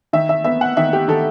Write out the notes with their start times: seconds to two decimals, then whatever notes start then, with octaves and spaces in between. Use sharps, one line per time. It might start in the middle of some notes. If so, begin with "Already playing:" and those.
0.13 D#3 E5
0.29 E5
0.44 B3 E5
0.61 F#5
0.77 D#3 E5
0.93 G4
1.08 D#3 A4